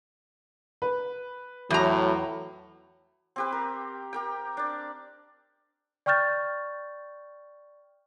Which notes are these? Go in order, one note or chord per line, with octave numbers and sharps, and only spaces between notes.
B4
E2 A2 F#3 A#5
C4 G4 B4
A#4
G4 A#4 G5
D4 D5
D5 G5 C#6 F6 G6 A6